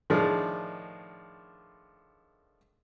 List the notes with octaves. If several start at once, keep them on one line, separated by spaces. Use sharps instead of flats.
A2 D#3 F3 D4 G#4 A#4